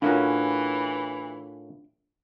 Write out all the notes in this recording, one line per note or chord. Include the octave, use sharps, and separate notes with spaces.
A2 E3 C#4 D4 F4 F#4 A#4 F5